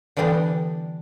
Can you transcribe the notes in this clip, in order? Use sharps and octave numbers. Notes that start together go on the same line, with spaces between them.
D3 E3 G3 B3 D4